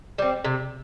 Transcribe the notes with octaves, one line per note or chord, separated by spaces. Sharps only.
G3 C4
C3